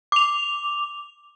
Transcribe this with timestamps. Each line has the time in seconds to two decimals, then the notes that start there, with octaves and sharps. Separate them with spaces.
0.12 D6 F7